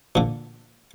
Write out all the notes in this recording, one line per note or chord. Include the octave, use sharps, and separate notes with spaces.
A#2 D3